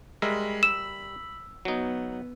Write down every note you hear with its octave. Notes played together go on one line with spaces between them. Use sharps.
G3 G#3 A#4 E5 B5
E6 E7
F#3 B3 D#4